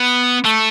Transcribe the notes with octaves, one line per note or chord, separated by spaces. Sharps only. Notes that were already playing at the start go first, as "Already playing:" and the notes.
Already playing: B3
A3